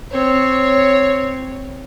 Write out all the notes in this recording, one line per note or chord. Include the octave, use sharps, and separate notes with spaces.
C4 C#5